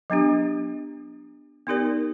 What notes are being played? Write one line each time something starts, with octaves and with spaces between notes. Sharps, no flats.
F#3 B3 D4 G4
B3 D#4 G4 A#4 D5